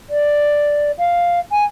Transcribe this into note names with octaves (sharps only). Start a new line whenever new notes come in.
D5
F5
G#5